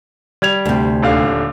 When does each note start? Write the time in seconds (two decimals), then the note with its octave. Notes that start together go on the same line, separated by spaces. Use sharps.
0.42 G3 G#6 F7
0.65 D2 C3
1.02 D#1 D3 F5